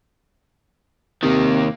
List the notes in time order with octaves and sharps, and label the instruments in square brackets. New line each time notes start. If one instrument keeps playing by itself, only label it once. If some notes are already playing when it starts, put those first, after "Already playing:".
[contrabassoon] C3 [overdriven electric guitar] D#3 A#3